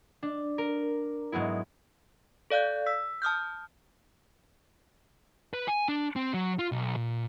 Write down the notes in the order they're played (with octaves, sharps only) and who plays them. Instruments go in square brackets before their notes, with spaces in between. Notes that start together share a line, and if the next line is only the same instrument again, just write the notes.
[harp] D4
A#4
G#2 F#3 G#3 B3 E4
[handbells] A4 D5 F5 F#6 G6
E6 B6
A5 D#6 F6 G6
[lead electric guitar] B4
G#5
D4
C4
F#3
F4
B1
A#2